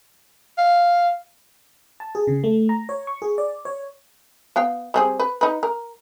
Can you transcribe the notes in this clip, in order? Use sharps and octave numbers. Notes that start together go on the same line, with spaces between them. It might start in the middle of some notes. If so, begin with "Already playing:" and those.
F5
A5
G#4
C#3
A3
A#5
C#5
C#6
G#4
D5
C#5
B3 F5 G5
G3 C4 G#4
B4
D#4 B4
A#4